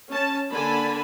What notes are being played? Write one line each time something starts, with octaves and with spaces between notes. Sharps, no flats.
C#4 A5
D3 A#3 G#5 A5 B5